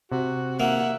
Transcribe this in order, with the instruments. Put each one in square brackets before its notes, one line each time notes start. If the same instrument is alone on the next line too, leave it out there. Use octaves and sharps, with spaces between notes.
[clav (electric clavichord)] C3 [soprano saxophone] F#4
[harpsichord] A#3 [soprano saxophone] E5 [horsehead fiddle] F#5